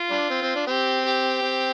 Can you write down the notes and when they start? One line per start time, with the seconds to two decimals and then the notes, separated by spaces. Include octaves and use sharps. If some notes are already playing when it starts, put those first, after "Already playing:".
Already playing: F4
0.11 G3 D4
0.30 C4
0.43 C4
0.56 D4
0.67 C4 G4
1.05 G4
1.43 C4